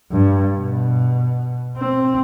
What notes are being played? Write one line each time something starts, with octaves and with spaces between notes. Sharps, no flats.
G2
B2
C4